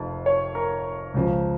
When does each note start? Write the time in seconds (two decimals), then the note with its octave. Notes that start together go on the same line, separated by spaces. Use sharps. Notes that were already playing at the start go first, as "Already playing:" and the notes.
Already playing: F1 F2 A5
0.26 C#5
0.55 A#4
1.14 C#2 C#3 F3